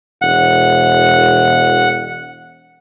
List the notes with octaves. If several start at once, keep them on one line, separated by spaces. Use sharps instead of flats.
E1 F#5